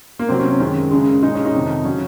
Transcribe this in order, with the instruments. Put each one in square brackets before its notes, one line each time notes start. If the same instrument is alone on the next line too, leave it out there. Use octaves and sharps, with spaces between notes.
[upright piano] A#3
C3 F#3 C4
C#4
C#4
F#2 D#3 G#3
F#2 C#3 G#3
A#2 G#3 D#4
C#4
D#4
F2 C3 D#3
C#3 F#3 C#4